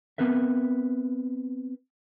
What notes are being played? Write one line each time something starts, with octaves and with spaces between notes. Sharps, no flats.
B3 C4 A#4 B4 E5